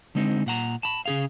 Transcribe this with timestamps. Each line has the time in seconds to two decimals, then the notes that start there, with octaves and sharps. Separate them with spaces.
0.15 D3 G#3 C4 D#4
0.46 A#2 F#5 A#5
0.83 A5 B5
1.06 C#3 G#4 F5